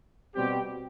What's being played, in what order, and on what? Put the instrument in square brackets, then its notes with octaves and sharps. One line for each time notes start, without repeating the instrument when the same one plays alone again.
[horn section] B2 G3 C4 G4